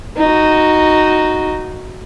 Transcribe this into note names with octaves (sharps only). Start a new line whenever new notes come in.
D#4 F#4